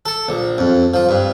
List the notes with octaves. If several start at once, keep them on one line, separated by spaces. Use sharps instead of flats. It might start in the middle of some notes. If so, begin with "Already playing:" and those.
A4
A#1
F2
F3
G2